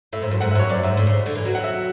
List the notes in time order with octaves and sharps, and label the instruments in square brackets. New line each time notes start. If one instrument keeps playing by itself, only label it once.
[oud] A2 [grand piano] E5
[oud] G#2
F#2
[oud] G#2 [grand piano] F#5
[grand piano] E5
[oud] F#2 [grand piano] C#5
[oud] F#2 [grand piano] D5
[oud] G#2 [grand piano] E5
[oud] A2
C#3
D3
E3
F#3
[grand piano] F#5
E5